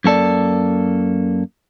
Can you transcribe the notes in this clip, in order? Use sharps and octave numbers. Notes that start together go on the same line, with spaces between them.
F#2 A#3 A4 D5